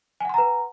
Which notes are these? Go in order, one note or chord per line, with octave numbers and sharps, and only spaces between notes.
B4 F#5 G#5 A#5 C6